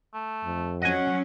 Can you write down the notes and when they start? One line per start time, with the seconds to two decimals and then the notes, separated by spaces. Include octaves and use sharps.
0.14 A3
0.45 F2
0.82 F#3 C#4 D#5 F#5 G#5